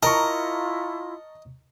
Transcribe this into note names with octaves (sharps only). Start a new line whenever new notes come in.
E4 F4 A#4 D#5 A5 A#5 C#6